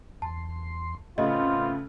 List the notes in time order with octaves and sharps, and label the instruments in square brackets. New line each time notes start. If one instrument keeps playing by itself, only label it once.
[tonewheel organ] E2 C6 [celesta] A5
[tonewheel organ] A2 [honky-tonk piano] C#3 A3 [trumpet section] B3 C4 F4 [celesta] D#5